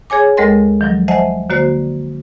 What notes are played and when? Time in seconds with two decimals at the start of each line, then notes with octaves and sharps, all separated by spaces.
0.10 G#4 C#5 G#5 D6
0.37 D2 G#3 A4 A#4 D#5 C6
0.81 D#3 F3 F#3
1.08 C5 D#5 E5 F#5 G#5 A5
1.50 D3 A#3 F#4 C5 D5